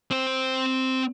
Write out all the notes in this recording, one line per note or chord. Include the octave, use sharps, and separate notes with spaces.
C4 C5